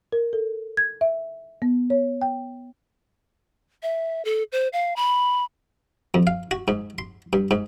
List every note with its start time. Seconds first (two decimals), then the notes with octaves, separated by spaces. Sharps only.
0.12 A#4
0.33 A4
0.77 G#6
1.01 E5
1.62 B3
1.90 C#5
2.22 G5
3.83 E5
4.25 A4
4.52 C5
4.73 F5
4.96 B5
6.14 F2
6.27 F5
6.51 F#4
6.68 G#2
6.98 C6
7.33 G2
7.51 G#2